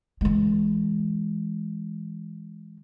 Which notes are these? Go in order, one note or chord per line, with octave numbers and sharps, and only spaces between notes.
E3 G#3